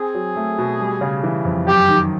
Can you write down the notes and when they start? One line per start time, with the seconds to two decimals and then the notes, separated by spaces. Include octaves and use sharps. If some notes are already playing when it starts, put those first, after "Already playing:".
Already playing: C4 G#4
0.14 F#3
0.36 A3
0.58 B2
0.80 G3
1.01 C#3
1.23 E3
1.45 F2
1.66 F#2 G4
1.89 D#3